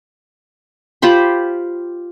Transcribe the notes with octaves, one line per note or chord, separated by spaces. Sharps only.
F4 G4 C5 B5